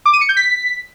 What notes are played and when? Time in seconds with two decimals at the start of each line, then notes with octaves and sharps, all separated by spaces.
0.06 D6
0.13 D#7
0.21 C#7
0.29 G6
0.37 B6